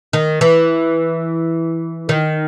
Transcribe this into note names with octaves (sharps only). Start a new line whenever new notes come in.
D#3
E3
D#3